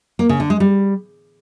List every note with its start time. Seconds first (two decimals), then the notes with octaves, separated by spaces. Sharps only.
0.19 A#3
0.29 C#3
0.40 D3
0.50 G#3
0.60 G3